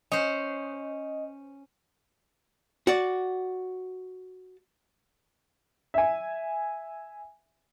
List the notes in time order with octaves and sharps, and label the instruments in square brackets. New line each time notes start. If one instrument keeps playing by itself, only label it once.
[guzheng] C#4 C5 [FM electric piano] D#5
[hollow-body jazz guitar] F#4 D5
[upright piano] E5 G#5